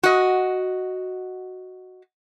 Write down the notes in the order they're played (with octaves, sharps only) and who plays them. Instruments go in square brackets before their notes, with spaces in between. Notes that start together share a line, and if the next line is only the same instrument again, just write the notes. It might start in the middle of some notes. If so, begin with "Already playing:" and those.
[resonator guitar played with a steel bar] F#4 D#5